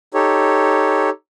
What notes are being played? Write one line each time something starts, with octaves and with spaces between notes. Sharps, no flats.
D#4 G4 A4 C#5